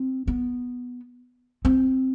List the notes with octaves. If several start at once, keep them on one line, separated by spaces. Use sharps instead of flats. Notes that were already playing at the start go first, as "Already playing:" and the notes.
Already playing: C4
B3
C4